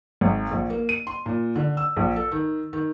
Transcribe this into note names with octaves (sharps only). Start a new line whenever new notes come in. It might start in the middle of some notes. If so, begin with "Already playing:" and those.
G#1
A#1
A#3
D#7
C6
A#2
D3
E6
A#1
A4
D#3
D#3